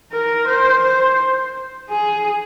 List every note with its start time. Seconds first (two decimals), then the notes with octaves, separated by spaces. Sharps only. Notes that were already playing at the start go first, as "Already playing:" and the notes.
0.13 A#4
0.47 C5
0.84 C5
1.91 G#4